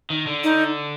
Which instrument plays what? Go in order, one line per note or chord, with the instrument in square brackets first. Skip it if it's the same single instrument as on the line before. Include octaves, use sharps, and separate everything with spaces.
[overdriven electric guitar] D#3
D3
[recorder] D#4